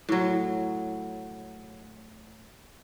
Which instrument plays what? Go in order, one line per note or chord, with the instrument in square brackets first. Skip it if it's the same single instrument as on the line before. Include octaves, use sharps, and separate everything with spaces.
[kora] A2 F#3